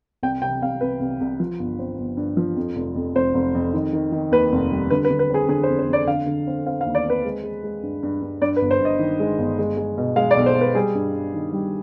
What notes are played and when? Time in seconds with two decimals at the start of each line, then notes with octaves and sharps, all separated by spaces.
0.23 C2 G5
0.42 C3 G5
0.62 C2 F5
0.81 C2 B4
1.00 C2
1.21 C2
1.40 F3
1.59 G1
1.79 C4
1.98 G1
2.17 G2
2.37 F3
2.56 F2
2.76 F1
2.96 F2
3.15 F1 C5
3.34 F1
3.54 F2
3.73 D#3
3.93 D#3
4.12 D#3
4.31 D#2 B4
4.52 F1
4.71 G3
4.90 D3 B4
5.05 B4
5.10 D3
5.19 B4
5.30 C4 G#4
5.48 D3 G#4
5.63 C5
5.69 F2
5.79 C5
5.87 F2
5.93 D5
6.07 D3 F5
6.26 D3
6.47 C4
6.66 C4 F5
6.81 F5
6.86 D#2
6.95 D5
7.06 C4 B4
7.25 G#3
7.44 G#3
7.64 G#3
7.83 G2
8.03 G2
8.22 G2
8.41 G2 D5
8.56 B4
8.61 G1
8.71 C5
8.81 G2 D#5
8.99 D#3
9.20 G#3
9.38 G1
9.59 G#3
9.77 G#3
9.98 B2
10.16 G#3 F5
10.31 D5
10.37 B1
10.46 C5
10.55 B1
10.61 B4
10.75 G3 G#4
10.95 G2
11.14 G2
11.34 D#3
11.53 G3